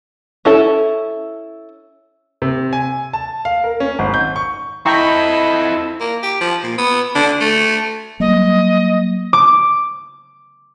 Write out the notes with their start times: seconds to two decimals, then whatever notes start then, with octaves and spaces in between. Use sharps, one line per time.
0.45 C#4 E4 A4
2.42 C3
2.73 G#5
3.13 A5
3.45 F5
3.64 A#4
3.80 C#4
3.99 G#1
4.14 G6
4.36 C#6
4.86 C4 E4 A4 D#5 G5 A#5 B5 C#6
6.01 A#3
6.23 G4
6.41 F3
6.63 A#2
6.78 B3
7.15 D3
7.41 A3
8.20 F#3 G3 A#3 D#5
9.33 D6